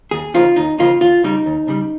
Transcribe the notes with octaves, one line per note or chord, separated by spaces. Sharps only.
D#2 G#4
C#3 F3 A#3 D#4 F4
D#2 D#4
C#3 F3 A#3 D#4 F4
D#2 F4
C#3 G3 D#4
D#2
C#3 G3